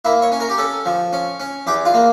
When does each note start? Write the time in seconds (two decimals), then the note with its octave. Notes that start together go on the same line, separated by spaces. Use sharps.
0.05 A#3 E4
0.22 C#5
0.32 C#4
0.40 A#4
0.50 G4
0.58 C#4 A4
0.86 F3
1.13 C#4
1.40 C#4
1.67 E2 G4
1.85 F4
1.94 A#3